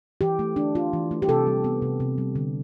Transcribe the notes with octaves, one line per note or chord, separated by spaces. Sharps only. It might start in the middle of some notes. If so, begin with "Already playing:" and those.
E3 G4
A3
D4
F4
E3
A3
G4
C3 A4
G3
B3
C3
C3
G3
D3